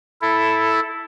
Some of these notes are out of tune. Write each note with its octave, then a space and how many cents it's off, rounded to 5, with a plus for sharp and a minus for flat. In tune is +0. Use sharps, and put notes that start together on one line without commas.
E4 +0 A4 +0